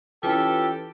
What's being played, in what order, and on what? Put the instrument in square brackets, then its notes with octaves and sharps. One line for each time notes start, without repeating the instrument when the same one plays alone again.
[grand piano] E3 C#4 E4 [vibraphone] F4 B4 [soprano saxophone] G4 [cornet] A4